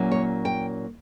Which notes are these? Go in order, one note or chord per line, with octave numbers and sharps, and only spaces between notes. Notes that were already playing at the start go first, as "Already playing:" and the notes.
Already playing: A#2 F#3 A#3 C#4 E4
C#5
G5